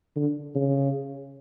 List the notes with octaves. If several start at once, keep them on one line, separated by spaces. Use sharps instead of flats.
D3
C#3